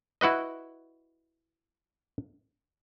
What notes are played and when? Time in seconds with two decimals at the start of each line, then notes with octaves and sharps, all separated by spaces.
0.21 E4 F#4 B4 D#5